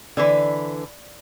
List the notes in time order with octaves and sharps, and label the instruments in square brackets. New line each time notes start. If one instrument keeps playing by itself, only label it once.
[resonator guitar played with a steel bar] D3 E3 B4 [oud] D5